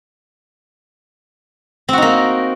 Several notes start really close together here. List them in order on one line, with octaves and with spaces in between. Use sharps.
C4 F#4 D#4 A#3